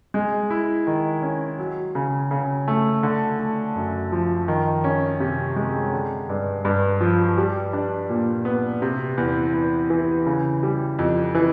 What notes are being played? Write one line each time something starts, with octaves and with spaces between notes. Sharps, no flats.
G#3
E4
D#3
C#4
F#3
C#3
C#3
A3
D3
A3
F#2
F3
D#3
C#4
C3
G#3
D3
G2
G2
F3
G3
D4
A#2
B3
C3
E2
E2
E3
C#3
G3
F2
E3